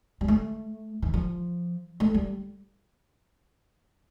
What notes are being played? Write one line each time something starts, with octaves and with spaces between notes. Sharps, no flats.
G3
A3
E3
F3
A3
G3